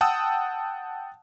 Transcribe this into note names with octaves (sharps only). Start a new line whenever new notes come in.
F#5 G5 A5 D#6 E6